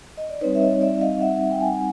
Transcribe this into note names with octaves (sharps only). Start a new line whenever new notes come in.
D#5
D5
G3 C4 D#4 B4 C#5
E5
C#5 D#5
D5 E5
D#5 F5
E5 F#5
G5
F#5 G#5